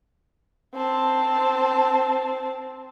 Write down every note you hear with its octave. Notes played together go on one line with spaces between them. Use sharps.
C4 A5